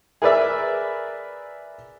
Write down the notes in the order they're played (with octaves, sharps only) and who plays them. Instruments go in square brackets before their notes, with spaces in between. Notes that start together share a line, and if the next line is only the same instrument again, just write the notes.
[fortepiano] G#4 A#4 B4 D5 E5